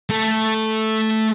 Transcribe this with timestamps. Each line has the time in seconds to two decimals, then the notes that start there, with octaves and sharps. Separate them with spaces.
0.10 A3 A4